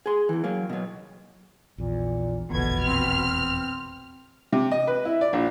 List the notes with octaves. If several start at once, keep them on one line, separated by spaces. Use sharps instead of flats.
G#4 C6
E2 E3
F#3 A#3
B2 F#3
A#1 E2 A#2
F1 A#1 E2 B2 D3 B3 G#6
C4 F6
C3
D#5
B4
E4
D5
A#1